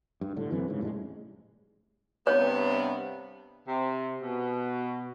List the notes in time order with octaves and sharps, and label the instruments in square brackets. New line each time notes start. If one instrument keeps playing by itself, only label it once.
[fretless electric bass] G2
A2 D3
F#1 F#2 C3 E3
G#2 C#3
F1 A2 G3 G#3
[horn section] G2 C3 B3 [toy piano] C#5
[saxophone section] C3
B2